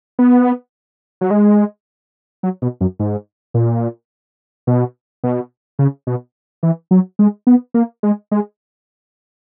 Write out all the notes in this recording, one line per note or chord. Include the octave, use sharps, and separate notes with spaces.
B3
F#3
G#3
F#3
B2
F#2
G#2
A#2
B2
B2
C#3
B2
E3
F#3
G#3
B3
A#3
G#3
G#3